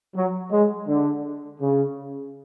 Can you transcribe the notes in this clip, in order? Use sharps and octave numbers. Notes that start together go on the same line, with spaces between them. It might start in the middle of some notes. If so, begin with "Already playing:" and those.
F#3
G#3
D3
C#3